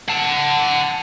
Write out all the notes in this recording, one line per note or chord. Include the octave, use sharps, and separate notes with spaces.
F#5 A5